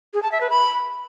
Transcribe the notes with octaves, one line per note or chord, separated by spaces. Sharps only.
G#4
A5
E5
B4
B5